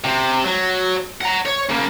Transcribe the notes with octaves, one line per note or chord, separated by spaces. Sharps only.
C3
F#3
F#5 A#5
C#5
C#3 A#3